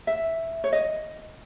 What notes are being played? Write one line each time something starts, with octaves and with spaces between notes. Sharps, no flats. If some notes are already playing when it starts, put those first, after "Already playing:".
E5
C#5
D#5